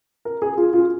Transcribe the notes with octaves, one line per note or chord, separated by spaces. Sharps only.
A#4
G#4
F4
F4